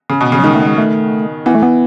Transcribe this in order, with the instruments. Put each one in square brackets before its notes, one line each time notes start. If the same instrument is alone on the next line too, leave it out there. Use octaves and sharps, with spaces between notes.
[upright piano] C#3
B2
C#3
[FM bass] F#3
[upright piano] D#3 [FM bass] G#3
[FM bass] A3
G#3
A3
[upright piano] E3 [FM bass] B3
[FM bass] A3
B3